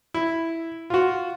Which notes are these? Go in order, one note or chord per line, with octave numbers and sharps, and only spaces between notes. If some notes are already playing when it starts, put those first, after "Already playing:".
E4
F4 F#4